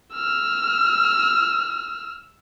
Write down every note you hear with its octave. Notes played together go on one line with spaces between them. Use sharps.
E6 F6